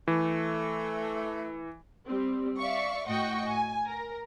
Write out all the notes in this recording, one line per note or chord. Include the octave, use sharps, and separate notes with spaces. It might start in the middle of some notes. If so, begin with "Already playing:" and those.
E3 A3
G3 C4
D5 E5 F5 C#6
A2 F#4 D#5 G5 C#6
G#5
A#4